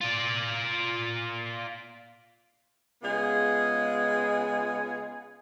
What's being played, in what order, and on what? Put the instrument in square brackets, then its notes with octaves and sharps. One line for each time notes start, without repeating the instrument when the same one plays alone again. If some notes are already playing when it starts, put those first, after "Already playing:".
[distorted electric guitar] F4 D5
[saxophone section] C#3 G#3 B3 F4 G#4